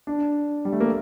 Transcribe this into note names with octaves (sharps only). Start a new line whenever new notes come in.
D4
G3
A3
A#3